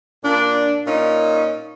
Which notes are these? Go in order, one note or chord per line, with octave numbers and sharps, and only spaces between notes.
A#2 D4
A#2 C#4 D#4